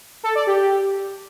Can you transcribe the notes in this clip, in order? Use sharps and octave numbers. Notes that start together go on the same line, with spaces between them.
A4
D5
G4